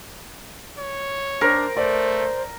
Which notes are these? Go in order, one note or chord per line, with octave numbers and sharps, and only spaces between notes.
C#5
D4 A#4 C5
A3 C5 D5